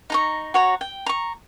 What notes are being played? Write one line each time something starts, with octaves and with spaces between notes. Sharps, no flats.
D#4 A#5 C#6
F#4 C#5 A#5
G5
A#5 C#6